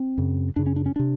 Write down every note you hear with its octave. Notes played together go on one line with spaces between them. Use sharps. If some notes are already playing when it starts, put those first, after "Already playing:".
Already playing: C4
F#2 C#3
F#2 C#3 D4
C#4
D4
C#4
C3 D4